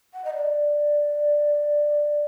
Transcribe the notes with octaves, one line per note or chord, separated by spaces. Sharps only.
F#5
D#5
D5